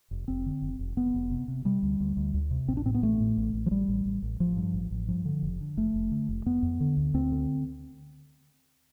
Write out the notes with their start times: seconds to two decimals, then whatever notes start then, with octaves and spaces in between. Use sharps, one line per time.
0.11 F1
0.28 F1 C4
0.46 D3
0.62 F1
0.79 F1
0.97 F1 B3
1.14 F1
1.31 C3
1.48 C3
1.65 C3 G3
1.83 D2
2.00 D2
2.17 D2
2.34 D2
2.51 C3
2.68 A1 C4
2.77 D4
2.85 A2 C4
2.94 B3
3.02 A1 A3
3.21 A2
3.37 A1
3.54 A1
3.66 F3
3.71 A1 G3
3.88 A1
4.06 A1
4.22 A1
4.40 A1 F3
4.57 G2
4.74 A1
4.91 A1
5.08 G2 F3
5.25 D3
5.43 F1
5.61 D3
5.77 F1 A3
5.94 F1
6.11 D3
6.29 F1
6.46 F2 B3
6.63 F2
6.80 D3
6.97 D2
7.14 D2 C4
7.32 D3